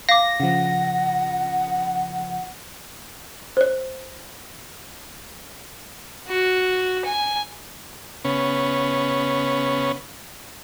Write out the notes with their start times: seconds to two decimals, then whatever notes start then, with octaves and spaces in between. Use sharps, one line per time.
0.09 F5 D6 A#6
0.40 C#3 F3 F#5
3.57 C5 C#5
6.28 F#4
7.05 G#5
8.25 C#3 B3 C#4